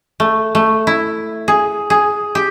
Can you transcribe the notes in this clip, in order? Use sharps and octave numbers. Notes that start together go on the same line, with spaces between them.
A3
A3
E4
G#4
G#4
G4